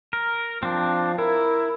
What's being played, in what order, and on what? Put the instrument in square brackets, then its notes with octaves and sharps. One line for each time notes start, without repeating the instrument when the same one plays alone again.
[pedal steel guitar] A#4
[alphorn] F3 [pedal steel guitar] C4 D4
[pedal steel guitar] E4 [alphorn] A#4